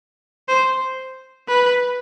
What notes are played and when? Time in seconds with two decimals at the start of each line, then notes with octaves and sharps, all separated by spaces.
0.49 C5
1.48 B4